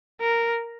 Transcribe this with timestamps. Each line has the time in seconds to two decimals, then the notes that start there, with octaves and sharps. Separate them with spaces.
0.20 A#4